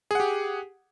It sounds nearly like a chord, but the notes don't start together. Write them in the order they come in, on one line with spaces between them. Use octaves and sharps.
G#4 F#5 G4